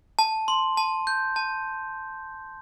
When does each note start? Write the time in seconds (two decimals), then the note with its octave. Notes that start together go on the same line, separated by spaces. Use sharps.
0.19 A5
0.48 C6
0.77 A5
1.07 G6
1.36 A5